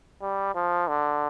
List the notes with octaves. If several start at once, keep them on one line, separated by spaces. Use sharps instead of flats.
G3
F3
D3